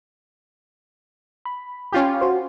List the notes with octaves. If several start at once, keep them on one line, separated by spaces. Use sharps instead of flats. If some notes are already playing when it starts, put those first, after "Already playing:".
B5
C#4 F4 G4
F#4 C5